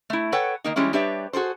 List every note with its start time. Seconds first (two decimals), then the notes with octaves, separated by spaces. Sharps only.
0.10 A3 E4
0.32 A4 B4 C#5 F#5 G5
0.64 D#3 A#3 D#4
0.76 E3 G3 G#3 C#4 E4
0.93 G3 D4 G4 B4 C#5 E5
1.33 F#4 G#4 A4 C5